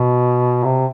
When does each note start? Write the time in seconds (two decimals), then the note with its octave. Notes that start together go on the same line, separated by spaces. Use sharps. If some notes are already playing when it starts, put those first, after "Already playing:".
Already playing: B2
0.64 C3